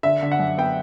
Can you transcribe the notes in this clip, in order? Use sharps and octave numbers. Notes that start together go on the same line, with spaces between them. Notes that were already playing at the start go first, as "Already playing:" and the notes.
D3 E5
D3
F#5
F#2
B3 G5